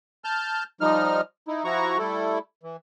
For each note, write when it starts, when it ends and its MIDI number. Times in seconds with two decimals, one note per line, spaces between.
0.24 0.64 81
0.24 0.64 89
0.24 0.64 91
0.81 1.21 53
0.81 1.21 55
0.81 1.21 63
0.81 1.21 89
1.48 1.64 63
1.48 1.64 64
1.65 1.98 53
1.65 1.98 64
1.65 1.98 66
1.65 1.98 82
1.65 1.98 85
1.98 2.39 55
1.98 2.39 57
1.98 2.39 64
1.98 2.39 69
2.63 2.77 52